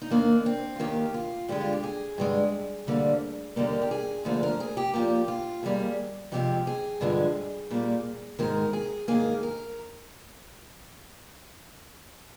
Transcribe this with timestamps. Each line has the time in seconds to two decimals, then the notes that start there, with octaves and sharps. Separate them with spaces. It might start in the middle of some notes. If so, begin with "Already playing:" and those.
0.02 D#4
0.10 D#2 D#3 A#3 D4
0.46 C4
0.76 F4
0.80 D#2 D#3 A#3 G4
1.14 F4
1.48 G2 D3 G#3 G4
1.61 F4
1.73 G4
1.84 G#4
2.18 G2 D3 G#3
2.87 D2 D3 G3 A#3
3.56 D#2 D3 G3 A#3 A#4
3.82 G4
3.91 G#4
4.25 D2 D3 F3 A#3 G#4
4.43 A#4
4.60 G#4
4.77 G4
4.94 A#2 F3 A#3 G4
5.28 F4
5.63 D#2 D#3 G3 A#3 G#4
6.32 F2 C3 F3 G#3 G4
6.67 G#4
7.01 G2 D3 F3 G#3
7.71 A#2 G3 A#3
8.39 G#2 D#3 G#3 A#4
8.73 G#4
9.08 G#2 D#3 A#3 G#4
9.43 A#4